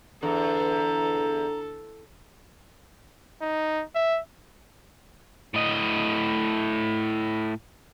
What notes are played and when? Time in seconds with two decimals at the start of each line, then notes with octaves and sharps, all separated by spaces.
0.23 E2 D3 A4 A#5
3.42 D#4
3.95 E5
5.54 A2 D#5